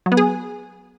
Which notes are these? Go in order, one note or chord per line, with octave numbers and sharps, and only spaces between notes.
F#3
B3
G#4